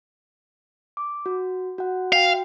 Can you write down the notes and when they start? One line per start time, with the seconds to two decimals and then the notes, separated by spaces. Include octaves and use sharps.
0.97 D6
1.26 F#4
1.78 F#4 F#5
2.13 F#4 F5 G5